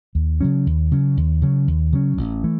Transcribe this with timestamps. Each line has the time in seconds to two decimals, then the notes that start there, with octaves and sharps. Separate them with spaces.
0.15 D#2
0.41 C#3 F#3 C#4
0.66 D#2
0.91 C#3 F#3 C#4
1.17 D#2
1.42 C#3 F#3 C#4
1.67 D#2
1.92 C#3 F#3 C#4
2.17 A1
2.44 E3 A3